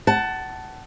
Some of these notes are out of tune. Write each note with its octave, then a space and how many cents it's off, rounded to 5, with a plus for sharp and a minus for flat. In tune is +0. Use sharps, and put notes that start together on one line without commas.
F#5 +25 A5 +0